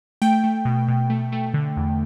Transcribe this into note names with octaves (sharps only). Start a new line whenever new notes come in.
A3 G5
A3
B2
B2
A3
A3
D3
E2